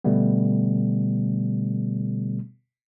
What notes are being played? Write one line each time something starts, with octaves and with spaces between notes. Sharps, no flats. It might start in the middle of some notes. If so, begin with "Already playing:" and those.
B2 D3 G3 A3 B3